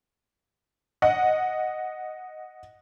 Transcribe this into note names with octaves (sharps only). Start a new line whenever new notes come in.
D#5 F#5